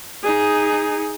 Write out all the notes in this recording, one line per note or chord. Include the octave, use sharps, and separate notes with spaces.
D#4 G#4